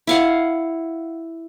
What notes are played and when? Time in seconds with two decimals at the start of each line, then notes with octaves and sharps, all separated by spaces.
0.07 E4 F5 F#5